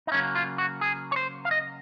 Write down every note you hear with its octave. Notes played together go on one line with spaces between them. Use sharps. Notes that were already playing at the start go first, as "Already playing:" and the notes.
D#4
C#3 F#3 A#3 C#4
F4
F#4
G#4
C#5
C5
F5
D#5